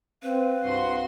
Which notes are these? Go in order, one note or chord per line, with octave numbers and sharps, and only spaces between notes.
C4 B4 F5
C2 G2 F#4 C6